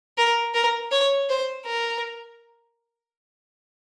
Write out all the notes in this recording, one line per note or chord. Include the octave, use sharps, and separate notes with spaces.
A#4
A#4
C#5
C5
A#4